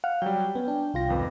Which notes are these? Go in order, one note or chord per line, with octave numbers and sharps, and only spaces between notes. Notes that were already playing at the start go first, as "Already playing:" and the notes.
F5 F#5
F#3 G3 G5
B3 C#4
D4
C2 F4 A#6
G#1 F2 B4